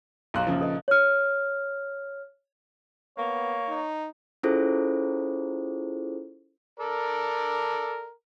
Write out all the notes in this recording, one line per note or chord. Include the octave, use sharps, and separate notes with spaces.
B1 D#4 F5 A#5 C6 F#6
A#1 C#3 F3
A4 B4 D#5
C#5 F6
A#3 B3 C#5
D#4
C#4 E4 F4 G#4 A4 C5
A4 A#4 D5